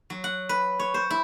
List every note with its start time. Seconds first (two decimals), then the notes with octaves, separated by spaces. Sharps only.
0.10 F#3
0.24 F#5
0.49 B4
0.79 C#5
0.94 C5
1.10 E4